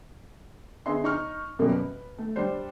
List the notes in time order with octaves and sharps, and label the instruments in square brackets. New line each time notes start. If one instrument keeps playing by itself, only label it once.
[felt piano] D3 B3 G#4 D#5 E5 C6
D#4 C#6 F6
F#2 B2 G3 A#3 B3
B4
A3
G3 D4 C5